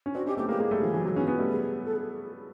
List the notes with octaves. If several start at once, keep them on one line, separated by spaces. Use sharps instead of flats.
C#4
C4 D4 F#4
C#4 D#4 G4
A3 B3 G4
G#3 A#3 G4
G#3 A#3 G#4
G3 A3
D#3 F3
E3 F#3
F#3 G#3
B3 C#4
B3 C#4
G3 A3
G#4
A4
G#4